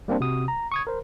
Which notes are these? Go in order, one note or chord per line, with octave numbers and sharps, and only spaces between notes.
G3 A#3 C4 D4 C5
C3 F#4 D#6
A#5
C#6 D#6 G#6
A#4 C5